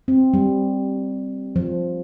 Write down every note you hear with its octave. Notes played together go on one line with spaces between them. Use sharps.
C4
G3
F3